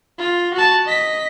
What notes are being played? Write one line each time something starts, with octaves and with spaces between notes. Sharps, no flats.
F4
F#4 A5
D#5 B6